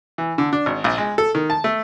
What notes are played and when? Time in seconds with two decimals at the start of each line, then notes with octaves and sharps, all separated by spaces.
0.18 E3
0.38 D3
0.53 D4
0.66 G#1
0.84 A#1
0.98 G#3
1.18 A4
1.35 D#3
1.50 A5
1.64 A3